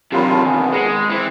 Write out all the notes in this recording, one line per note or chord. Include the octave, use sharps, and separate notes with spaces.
E2 C3 D#3 F#3 F4 G4 B5
A5
D#3 B3 G#5
G#3 B5 A#6 C#7
E3 C4